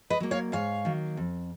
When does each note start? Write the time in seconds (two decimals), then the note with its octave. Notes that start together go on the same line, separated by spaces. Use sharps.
0.10 B4 D#5
0.20 F#3 A#3
0.31 C#5 F5
0.52 G#2 C#5 F5
0.85 D#3 F#3 A#3
1.17 F2